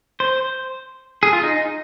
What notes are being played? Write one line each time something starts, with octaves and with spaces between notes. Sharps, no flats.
C5
G#4
F4
D#4